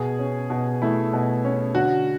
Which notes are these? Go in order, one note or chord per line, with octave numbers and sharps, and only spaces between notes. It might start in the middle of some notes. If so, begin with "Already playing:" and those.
Already playing: B2 G#4
C#4
B2
A3 E4
B2
C#4
D3 F#4